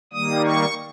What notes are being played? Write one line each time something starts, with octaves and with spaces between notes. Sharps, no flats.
D#3 G3 A#3 D#6
C#6